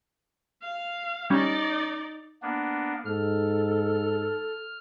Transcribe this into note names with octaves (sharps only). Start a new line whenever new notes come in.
F5
G3 C#4 D#4 D5
A#3 B3 D4
G#2 A4 F6